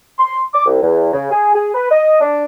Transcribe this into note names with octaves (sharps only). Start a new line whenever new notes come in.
C6
D6
C2
E2
C#3
G#4
G#4
B4
D#5
D4